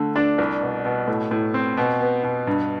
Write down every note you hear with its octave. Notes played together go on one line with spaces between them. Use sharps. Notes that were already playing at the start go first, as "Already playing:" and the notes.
Already playing: D3 A3
D4
C2
B2
B2
A2
A2
C4
B2
B3
B2
G2